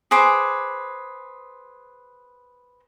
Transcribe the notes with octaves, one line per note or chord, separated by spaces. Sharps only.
G#4 B4 C5 D6